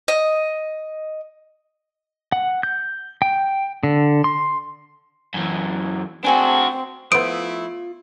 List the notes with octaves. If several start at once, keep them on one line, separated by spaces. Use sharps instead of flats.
D#5
F#5
G6
G5
D3
C6
F#2 E3
C4 D4 F#4 G#4 A4 G#5
F3 A3 B3 E4 F4 C5 D#6 D7